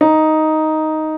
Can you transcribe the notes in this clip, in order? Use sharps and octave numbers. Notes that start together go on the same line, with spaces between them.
D#4